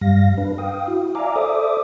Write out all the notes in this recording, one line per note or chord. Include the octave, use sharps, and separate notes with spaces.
G2 G3 F5 A#6
D4 B4
F5 G5 D#6
E4 F#4
D5 E5 F5 G#5 A#5 D6
A4 C5 D5 E5 D6 D#6